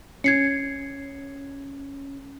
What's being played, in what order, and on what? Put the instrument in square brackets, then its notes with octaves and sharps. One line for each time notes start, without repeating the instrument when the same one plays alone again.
[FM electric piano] C#4 [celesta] G#6 C7 C#7